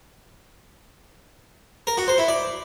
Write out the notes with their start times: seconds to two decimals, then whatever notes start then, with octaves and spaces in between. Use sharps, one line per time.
1.87 A#4
1.97 F#4
2.08 C5
2.18 E4
2.28 D5